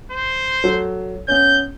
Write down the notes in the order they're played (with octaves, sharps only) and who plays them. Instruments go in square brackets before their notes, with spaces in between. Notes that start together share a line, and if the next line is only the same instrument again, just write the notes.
[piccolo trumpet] C5
[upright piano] F#3 A4
[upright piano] B3 C#4 [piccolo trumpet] G6